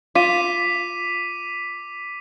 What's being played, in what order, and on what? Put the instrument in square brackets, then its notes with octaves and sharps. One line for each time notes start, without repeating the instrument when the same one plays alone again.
[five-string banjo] F4 [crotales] D6 B6 D#7